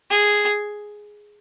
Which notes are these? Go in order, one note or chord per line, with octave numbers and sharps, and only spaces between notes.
G#4